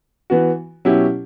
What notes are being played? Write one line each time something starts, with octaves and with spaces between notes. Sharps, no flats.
E3 B3 F#4
B2 F#3 C#4 E4 G4